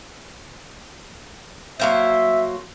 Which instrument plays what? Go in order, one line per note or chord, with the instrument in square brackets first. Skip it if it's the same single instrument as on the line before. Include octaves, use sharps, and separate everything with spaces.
[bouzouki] F#3 A#3 C5 [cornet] E5